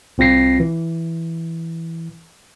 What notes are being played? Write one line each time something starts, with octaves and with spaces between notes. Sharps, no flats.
C2 C4 F4 A#6 C7
E3